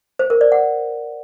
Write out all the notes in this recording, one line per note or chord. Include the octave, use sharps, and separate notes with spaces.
C5
A#4
D5
F#5